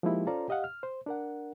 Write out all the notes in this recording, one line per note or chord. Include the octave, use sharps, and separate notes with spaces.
F3 G#3 A#3 D#4 E4 G4
C#4 F4 A4 C5 D5 A#5
G4 D#5 F5 F#5
F6
C5
D4 A#4 F#5